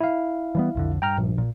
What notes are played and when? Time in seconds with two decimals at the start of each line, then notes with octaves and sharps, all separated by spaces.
0.01 E4 F5
0.55 E3 G3 B3
0.75 B1 F2 D3
1.02 G2 G5 A#5 F6
1.18 A#1
1.38 A#2